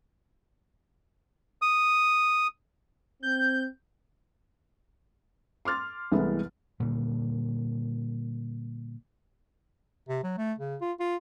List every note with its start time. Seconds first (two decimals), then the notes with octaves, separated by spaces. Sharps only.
1.62 D#6
3.23 C4 G6
5.65 C6 D6 F6 A6
6.12 C2 E3 G#3 A3 B3
6.80 A#2 D3 G3
10.09 C3
10.23 F#3
10.38 A3
10.59 C#3
10.81 F4
11.00 F4